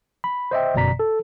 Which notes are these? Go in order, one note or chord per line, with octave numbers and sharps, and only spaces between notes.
B5
C5 D#5 E5 G5
G1 F#2 B2 D5 A#5 B6
A4